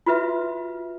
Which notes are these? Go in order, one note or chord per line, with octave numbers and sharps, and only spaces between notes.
F4 F#4 B4 E5